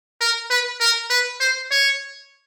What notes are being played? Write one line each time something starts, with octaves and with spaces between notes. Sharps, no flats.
A#4
B4
A#4
B4
C5
C#5